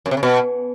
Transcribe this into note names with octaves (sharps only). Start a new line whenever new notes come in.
F#2
C3
C#3
B2